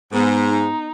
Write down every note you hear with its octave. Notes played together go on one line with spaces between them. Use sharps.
G#2 B3
D#4